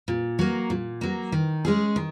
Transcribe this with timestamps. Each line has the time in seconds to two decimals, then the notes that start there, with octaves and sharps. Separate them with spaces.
0.08 A#2
0.39 F#3 A#3
0.70 A#2
1.01 F#3 A#3
1.32 D#3
1.65 G#3 C#4 G#4
1.96 D#3